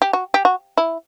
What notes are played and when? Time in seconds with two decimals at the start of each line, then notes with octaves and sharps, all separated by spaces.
0.02 G4
0.13 F#4
0.34 G4
0.45 F#4
0.78 E4